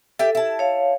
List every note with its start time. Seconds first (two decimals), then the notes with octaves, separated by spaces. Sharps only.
0.19 G4 A4 E5
0.35 E4 A5
0.59 C#5 F5